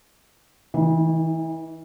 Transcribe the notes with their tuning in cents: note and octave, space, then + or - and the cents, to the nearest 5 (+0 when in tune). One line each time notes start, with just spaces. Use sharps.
E3 -30 D#4 +15